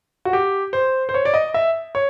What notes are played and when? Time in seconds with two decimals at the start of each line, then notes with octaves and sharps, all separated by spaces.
0.25 F#4
0.33 G4
0.73 C5
1.09 C5
1.14 C#5
1.25 D5
1.34 D#5
1.54 E5
1.95 C#5